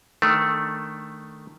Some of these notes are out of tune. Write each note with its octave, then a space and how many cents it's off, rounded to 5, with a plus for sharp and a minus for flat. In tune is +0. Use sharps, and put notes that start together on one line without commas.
D#3 +0 A3 +0 D4 +10